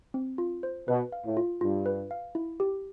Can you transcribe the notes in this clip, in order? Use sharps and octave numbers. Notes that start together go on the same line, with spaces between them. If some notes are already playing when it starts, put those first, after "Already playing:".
C4
F4
C5
B2 B4
F5
A2
F4
G2 F4
B4
F5
E4
G4